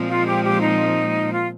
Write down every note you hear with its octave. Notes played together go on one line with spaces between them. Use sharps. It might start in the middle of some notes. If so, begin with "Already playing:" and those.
Already playing: A#2 F3 G#3 C4
F4
G4
G4
D#4
F4